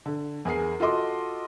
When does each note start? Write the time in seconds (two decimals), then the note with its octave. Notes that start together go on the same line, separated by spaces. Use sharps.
0.06 D3
0.45 E2 G#4 A#4 G#5 C7
0.80 F4 F#4 A4 D#5 C6 D6